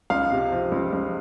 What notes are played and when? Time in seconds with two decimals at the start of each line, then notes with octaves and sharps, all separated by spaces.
0.10 C#2 F5
0.31 C3
0.52 F3
0.72 C#2
0.93 C#2